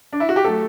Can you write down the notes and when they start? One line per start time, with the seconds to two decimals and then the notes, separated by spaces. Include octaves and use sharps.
0.13 D4
0.20 E4
0.29 F#4
0.36 G4
0.45 F#3 A3 A4